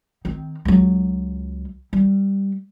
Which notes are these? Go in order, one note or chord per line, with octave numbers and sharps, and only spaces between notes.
D#3 C4
C#2 F#3
G3